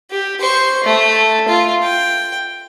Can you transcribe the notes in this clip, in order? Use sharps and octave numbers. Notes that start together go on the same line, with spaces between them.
G4
C5 C#6
A3
F4
G5